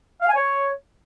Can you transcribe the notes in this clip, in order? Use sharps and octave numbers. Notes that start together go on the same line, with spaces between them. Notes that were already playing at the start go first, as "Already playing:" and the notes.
F5
G#5
C#5